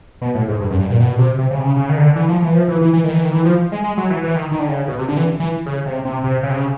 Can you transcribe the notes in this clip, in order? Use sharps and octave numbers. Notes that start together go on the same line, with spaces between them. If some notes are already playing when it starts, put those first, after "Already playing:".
B2
A2
G#2
G2
F#2
G2
A#2
B2
C3
C3
C#3
C3
C#3
C#3
D#3
D3
E3
F3
E3
F3
E3
E3
E3
D#3
E3
D#3
E3
F3
G#3
G#3
F#3
E3
E3
D#3
D#3
D3
C#3
B2
C3
D3
E3
E3
C#3
C3
C3
C3
C#3
C3
C#3